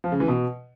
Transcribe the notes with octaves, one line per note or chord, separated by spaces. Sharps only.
F3
C#3
E3
B2